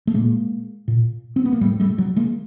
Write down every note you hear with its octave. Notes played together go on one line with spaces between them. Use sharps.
A3
A#2 G#3 A#3
A#2
C4
B3
A#3
A2 G3 A3
G3 A3
F#3 G#3
G#3 A#3